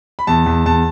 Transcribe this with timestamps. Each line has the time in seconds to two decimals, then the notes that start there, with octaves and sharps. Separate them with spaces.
0.19 B5
0.27 E2 A5
0.46 E2
0.66 E2 A5